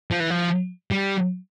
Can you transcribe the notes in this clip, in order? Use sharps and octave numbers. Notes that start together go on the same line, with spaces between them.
F3
E3
F3
G3